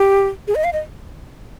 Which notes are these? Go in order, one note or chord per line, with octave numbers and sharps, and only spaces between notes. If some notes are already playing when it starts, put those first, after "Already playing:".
Already playing: G4
G#4
D#5
F5
D#5